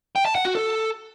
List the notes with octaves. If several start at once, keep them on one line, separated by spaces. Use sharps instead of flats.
G5
A5
F#5
F#4
A4